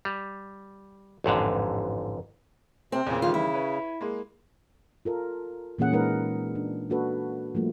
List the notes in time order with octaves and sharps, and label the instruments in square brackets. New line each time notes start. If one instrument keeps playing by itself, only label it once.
[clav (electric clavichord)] G3
A1 F2 G#2 D3
[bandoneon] C3 [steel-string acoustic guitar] C4
[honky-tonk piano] E2 A#2 [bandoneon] C#3
[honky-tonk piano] D#3 E3 G3 [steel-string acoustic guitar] F4
[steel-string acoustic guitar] E4
[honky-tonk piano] B4 C#5
G#3 A#3
[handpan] F4 A4 A#4
A#2 E3 A#3 C#4 G#4 F#5
G#3 D#4 A#4 B4 F#5
D4
A#3 D4 F#4 A4 B4
F3 G3 A3 A#3